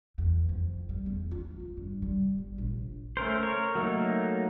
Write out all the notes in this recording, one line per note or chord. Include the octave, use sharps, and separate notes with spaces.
E2
F2
G3
E2
F4
D2
G2
G3
G1
A#1
A3 C#4 A#4 C5
A#4 C#5
F#3 A3 A#3 D#4